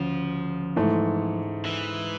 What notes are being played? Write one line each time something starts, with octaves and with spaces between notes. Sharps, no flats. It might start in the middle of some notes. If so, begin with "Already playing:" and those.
Already playing: D2 C#3 F3
G#2 E3 A3
E3